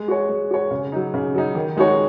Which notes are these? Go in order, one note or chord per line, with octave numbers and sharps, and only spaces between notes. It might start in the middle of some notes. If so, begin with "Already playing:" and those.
Already playing: G#3
F#4 C#5
G#3
F#4 C#5
C#3
F#3 D#4
C#3
F#3 D#4
D#3
G#3 D#4 F#4 C#5